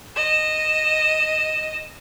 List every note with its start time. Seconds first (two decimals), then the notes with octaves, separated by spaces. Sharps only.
0.16 D#5 E7